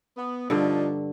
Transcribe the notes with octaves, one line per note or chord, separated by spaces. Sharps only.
B3
G2 D3 F3 D4 D#4